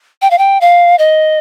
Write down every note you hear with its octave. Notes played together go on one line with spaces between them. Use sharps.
G5
F5
G5
F5
D#5